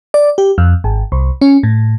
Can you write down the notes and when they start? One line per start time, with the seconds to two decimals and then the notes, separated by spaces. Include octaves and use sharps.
0.14 D5
0.38 G4
0.58 F2
0.84 G#1
1.12 C2
1.41 C#4
1.63 A2